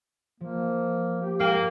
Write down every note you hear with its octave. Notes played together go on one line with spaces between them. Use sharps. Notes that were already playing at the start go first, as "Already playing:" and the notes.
F3 A#3
G4
A#3 G5